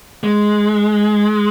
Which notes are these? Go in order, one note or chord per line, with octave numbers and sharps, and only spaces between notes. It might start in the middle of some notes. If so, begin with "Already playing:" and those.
G#3